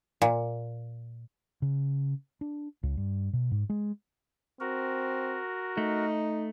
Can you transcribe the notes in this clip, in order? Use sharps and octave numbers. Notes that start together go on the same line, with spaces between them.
A#2
C#3
D4
C#2
G2
B2
G#2
G#3
C4 F#4 A#4
A3 D#4